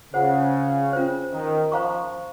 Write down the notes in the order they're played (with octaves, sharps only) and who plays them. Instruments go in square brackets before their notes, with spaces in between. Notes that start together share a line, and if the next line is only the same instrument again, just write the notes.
[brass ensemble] C#3 [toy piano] F4 G#4 C5 F#5
[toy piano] C#4 F4 C5
[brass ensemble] D#3
[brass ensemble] F3 [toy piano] C5 F5 A#5 C#6